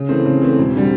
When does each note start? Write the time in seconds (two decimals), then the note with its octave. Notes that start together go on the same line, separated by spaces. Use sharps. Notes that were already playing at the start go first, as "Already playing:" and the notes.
Already playing: C#3
0.09 E3 A3 C4
0.25 C#3
0.41 E3 A3 C4
0.58 E1
0.75 D3 G3 C4